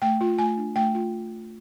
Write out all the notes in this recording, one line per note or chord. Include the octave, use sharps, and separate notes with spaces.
A3 G5
F4
A3 G#5
D4
A3 G5
F4